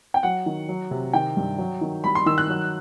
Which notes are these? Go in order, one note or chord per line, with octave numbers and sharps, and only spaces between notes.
G5
F#3 F#5
D#3
F#3
C3
D#3 G5
G2
F#3
D#3
G3 B5
C6
D#3 E6
F#6
F#3